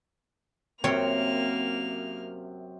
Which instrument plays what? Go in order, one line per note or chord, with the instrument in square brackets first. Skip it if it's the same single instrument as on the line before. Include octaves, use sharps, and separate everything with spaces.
[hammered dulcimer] F#2 C3 E5 [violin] A#3 F6 [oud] C4 [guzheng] C#5